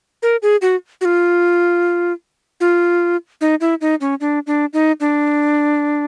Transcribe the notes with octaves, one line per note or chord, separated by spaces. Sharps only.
A#4
G#4
F#4
F#4
F4
F4
D#4
E4
D#4
C#4
D4
D4
D#4
D4